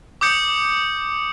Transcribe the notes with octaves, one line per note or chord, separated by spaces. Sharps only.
D6 D#6 G6 C#7